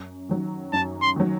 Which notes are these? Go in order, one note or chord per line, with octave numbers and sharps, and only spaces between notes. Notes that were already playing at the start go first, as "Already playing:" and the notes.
Already playing: F#2
D#3 F#3
F#2 A5
C6
D#3 F#3